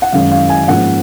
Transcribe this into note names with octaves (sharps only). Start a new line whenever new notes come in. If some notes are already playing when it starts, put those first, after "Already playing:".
F#5
F#2 D#3 G#3 C#4 F5
F5
G#5
G#2 F3 A#3 C#4 F#5